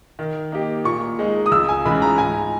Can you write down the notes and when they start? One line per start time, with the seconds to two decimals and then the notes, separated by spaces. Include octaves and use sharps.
0.19 D#3
0.52 A#3 D#4 G4
0.84 A#2 C#6
1.19 G#3 D#4
1.46 D#6
1.51 C#2 E6
1.69 G#5
1.85 C#3 E3 G#3 D#4 B5
2.02 A#5
2.18 G#2 G#5